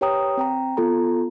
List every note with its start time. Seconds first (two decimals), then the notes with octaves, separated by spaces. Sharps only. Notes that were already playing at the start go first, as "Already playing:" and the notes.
0.01 G4 B4 C#5 G5 A#5 D#6
0.37 C4 G5 A#5
0.77 B3 F4 A4 A#5